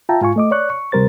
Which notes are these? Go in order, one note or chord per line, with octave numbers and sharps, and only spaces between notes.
F4 E5 G5 A5 A#5
G#2 F4 G#5 C#6
A3 D#5 D6
C#5 D5 C#6 F#6
C#6
D2 C3 G3 A#4 C5 A6